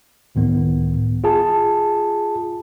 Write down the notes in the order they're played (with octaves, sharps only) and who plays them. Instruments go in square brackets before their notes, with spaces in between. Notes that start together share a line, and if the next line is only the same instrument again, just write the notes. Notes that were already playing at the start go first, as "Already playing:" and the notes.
[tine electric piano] C#2 A2 D#3 B3
F4 G#4 A5